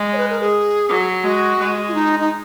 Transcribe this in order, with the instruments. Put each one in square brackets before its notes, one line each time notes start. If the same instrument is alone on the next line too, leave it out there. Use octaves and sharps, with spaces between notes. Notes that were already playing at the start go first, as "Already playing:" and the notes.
Already playing: [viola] G#3
[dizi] C#5
B4
A#4
G#4
[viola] F#3
[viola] G#3 [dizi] F#4
[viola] G#3
[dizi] F4
D#4
D#4